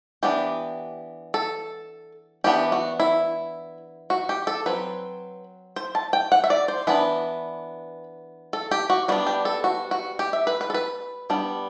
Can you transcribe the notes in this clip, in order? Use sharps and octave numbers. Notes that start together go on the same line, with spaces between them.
E3 B3 D4 G4
A4
E3 B3 D4 G4
F#4
E4
F#4
G4
A4
F#3 C4 B4
C5
A5
G5
F#5
E5
D5
C5
E3 B3 D4 B4
A4
G4
F#4
G3 B3 D4 F#4
G4
A4
F#4
F#4
G4
E5
B4
B4
A4
B4
G3 B3 D4